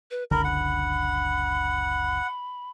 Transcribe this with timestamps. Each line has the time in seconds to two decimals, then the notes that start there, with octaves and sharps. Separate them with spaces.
0.11 B4
0.31 F#1 C#2 D3 A#4 B5
0.44 F#5